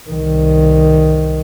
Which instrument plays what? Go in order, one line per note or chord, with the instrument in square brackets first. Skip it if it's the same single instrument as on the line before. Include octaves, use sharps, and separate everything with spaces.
[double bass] C2 D#3